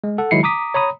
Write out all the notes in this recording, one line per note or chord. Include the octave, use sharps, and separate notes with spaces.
G#3
A4 F#5
D#3 F#3 G#3 E4 C7 C#7
A#5 D6 D#6 B6
C#5 A#5 B5 D#6